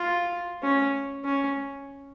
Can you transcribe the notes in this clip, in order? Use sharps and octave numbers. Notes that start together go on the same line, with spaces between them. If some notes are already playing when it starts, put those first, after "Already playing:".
Already playing: F4
C#4
C#4